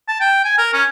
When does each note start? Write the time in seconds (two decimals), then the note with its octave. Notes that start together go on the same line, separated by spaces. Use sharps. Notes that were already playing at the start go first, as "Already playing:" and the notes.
0.08 A5
0.21 G5
0.45 G#5
0.58 A#4
0.73 C#4